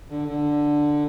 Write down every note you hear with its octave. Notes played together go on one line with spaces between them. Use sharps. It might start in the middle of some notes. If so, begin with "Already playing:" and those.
D3
D3